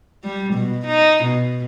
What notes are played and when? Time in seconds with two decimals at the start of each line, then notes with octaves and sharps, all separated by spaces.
0.24 G3
0.54 B2
0.87 D#4
1.24 B2